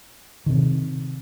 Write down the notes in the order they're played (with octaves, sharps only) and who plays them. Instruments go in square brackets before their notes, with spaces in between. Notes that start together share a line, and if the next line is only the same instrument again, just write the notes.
[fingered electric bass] C3 D#3